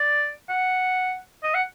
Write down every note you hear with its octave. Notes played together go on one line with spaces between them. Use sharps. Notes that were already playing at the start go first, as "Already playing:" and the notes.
Already playing: D5
F#5
D#5
F#5